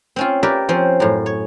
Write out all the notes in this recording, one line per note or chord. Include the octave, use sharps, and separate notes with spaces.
C4 C#4 F4
G4 A#4 B4 D5 E5
F3 C4 C#4 C5
F#2 A2
C#5